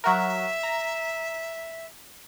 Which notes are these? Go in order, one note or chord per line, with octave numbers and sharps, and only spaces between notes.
F#3 F#4 A#4 E5
A#5